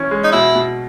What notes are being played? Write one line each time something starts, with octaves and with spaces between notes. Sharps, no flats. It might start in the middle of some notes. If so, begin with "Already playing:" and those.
Already playing: E3 C#4 E4
G#3
D#4
B2 E4
B2